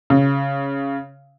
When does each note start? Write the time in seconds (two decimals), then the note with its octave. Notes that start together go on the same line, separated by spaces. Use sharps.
0.10 C#3